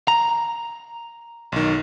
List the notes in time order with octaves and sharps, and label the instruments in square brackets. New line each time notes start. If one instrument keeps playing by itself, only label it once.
[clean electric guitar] A#5
[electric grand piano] B1 D#3